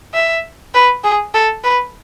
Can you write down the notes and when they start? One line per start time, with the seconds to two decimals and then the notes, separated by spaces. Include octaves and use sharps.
0.14 E5
0.74 B4
1.04 G#4
1.34 A4
1.64 B4